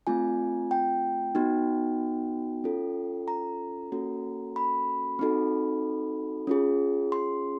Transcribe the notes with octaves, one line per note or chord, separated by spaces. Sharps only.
A3 C4 F4 G#5
G5
B3 D#4 F#4
C#4 F4 A4
A#5
A#3 C#4 F#4 A4
B5
C4 D#4 F#4 A4
C#4 F4 G#4
C6